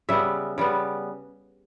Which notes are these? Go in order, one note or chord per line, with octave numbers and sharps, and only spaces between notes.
C#3 G3 B3 E5
C#3 G3 B3